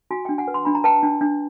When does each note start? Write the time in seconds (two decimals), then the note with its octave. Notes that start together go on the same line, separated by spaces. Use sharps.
0.11 F#4 G#5
0.25 D4 G5
0.38 F#5 G#5
0.48 B4
0.54 C6
0.65 D4 B5
0.75 A#5
0.84 B4 G5 A5
1.03 D4
1.21 D4